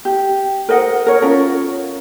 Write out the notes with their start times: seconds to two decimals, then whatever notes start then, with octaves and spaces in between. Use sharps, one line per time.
0.05 G4
0.69 A#4 C5 D#5 F#5
1.06 A#4 C#5
1.22 C#4 F4 A#4